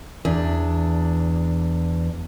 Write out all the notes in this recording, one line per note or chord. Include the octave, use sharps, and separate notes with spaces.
E2 D4